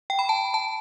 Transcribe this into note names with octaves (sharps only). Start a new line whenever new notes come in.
G5
B5
A5
A5